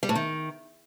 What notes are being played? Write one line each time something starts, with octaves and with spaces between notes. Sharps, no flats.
G3
A2
D#3